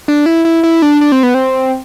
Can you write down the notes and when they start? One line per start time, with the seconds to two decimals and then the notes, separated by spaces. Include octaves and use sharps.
0.08 D4
0.26 E4
0.45 E4
0.63 E4
0.82 D4
1.01 D4
1.12 C4
1.23 B3
1.34 C4